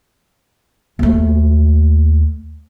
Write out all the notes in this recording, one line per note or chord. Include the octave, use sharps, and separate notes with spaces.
D#2 A3